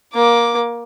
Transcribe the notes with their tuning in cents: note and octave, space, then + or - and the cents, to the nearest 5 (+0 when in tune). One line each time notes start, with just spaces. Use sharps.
A#3 +20 D6 +0